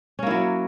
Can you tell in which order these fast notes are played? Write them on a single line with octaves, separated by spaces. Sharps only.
C#4 A#3 E4 F#3